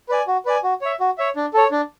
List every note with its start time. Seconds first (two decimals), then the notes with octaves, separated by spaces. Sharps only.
0.09 B4 D5 G#5
0.27 F#4
0.45 B4 D5 G#5
0.64 F#4
0.81 C#5 E5
1.00 F#4
1.18 C#5 E5
1.36 D4
1.54 A4 C#5
1.71 D4